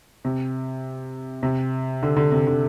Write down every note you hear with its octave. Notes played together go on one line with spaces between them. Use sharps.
C3
C3
D3
D3
C3
D3